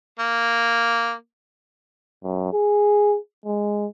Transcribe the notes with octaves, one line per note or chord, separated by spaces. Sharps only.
A#3
F#2
G#4
G#3